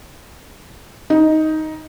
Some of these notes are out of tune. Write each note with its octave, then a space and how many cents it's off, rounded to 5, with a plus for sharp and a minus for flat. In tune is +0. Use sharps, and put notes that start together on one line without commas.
D#4 +10